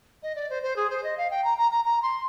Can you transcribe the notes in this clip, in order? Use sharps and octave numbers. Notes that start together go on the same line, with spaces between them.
D#5
D5
C5
C5
G#4
C5
D#5
F5
G5
A#5
A#5
A#5
A#5
C6